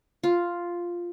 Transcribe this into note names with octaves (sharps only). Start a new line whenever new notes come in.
F4